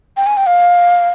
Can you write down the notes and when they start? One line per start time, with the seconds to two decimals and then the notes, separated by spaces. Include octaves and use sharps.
0.17 G5
0.26 G#5
0.37 G5
0.46 F5